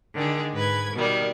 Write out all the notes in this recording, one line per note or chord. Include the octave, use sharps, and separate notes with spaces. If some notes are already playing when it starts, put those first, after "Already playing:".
D3 D#3 G#3
G#2 B4 G#6
B2 D#3 G3